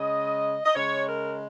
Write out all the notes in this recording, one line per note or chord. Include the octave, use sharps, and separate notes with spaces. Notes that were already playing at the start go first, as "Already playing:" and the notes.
Already playing: C#3 G#3 D#5
D#5
C#3 G#3 C#5
A#4